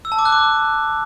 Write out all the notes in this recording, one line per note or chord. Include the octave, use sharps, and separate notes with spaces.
E6
A5
D6
F#6
D6